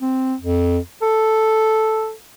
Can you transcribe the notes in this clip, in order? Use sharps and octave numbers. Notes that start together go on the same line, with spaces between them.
C4
F2
A4